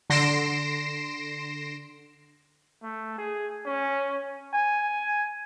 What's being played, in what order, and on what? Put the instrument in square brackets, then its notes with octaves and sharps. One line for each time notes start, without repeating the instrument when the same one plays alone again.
[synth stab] D3 C6 A#6 C7 D7 E7
[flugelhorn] A3
G#4
C#4
G#5